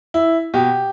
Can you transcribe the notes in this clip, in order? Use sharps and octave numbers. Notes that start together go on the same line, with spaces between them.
E4
B2 G4